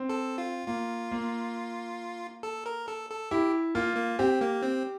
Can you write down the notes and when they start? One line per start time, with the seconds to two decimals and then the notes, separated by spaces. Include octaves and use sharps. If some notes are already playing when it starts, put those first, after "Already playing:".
Already playing: C4
0.09 A4
0.38 F4
0.67 A#3 F4
1.12 A#3
2.43 A4
2.66 A#4
2.88 A4
3.10 A4
3.31 E4 G4
3.75 A#3 F4
3.96 A#3
4.19 C4 G4
4.41 A#3
4.62 C4